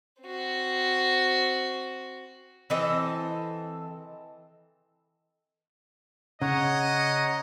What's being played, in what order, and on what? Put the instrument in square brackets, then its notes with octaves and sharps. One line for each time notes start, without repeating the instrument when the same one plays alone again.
[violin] C4 F#4
[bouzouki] E3 C4 A4 D#5
[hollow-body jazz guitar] C#3 [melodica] C#5 F#5 A#5 [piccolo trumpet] D#5